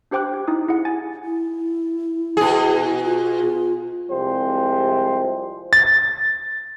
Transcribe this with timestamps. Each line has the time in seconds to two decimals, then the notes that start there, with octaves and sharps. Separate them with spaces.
0.11 D4 G4 C5 G5 D6 F#6
0.33 G4
0.48 D#4 E4 D#6
0.68 E4 G#4 F#5
0.85 G#5 A6
1.24 E4
2.37 B2 G#4
3.05 F4
4.10 C2 C3 F3 G#3 G4 C5
5.73 A6